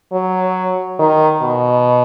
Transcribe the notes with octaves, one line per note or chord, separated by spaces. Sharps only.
F#3
D#3
B2